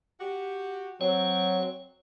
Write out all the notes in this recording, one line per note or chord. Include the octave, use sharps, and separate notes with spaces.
F#4 G4
F#3 C4 C#5